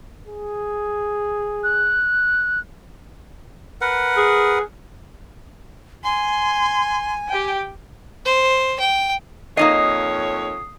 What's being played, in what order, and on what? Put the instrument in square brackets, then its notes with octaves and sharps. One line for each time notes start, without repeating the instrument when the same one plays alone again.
[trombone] G#4
[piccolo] F#6
[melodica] A#4 B4 F#5
[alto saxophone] G#4
[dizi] G#5 [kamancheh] C6
[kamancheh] G4 G5
[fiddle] C5
G5
[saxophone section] F2 C#5 [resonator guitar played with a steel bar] A#3 D#4 D#5 [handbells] D#6 C7